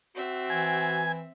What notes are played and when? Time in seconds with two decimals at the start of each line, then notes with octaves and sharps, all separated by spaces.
0.15 C4 F#4 E5
0.50 E3 G#5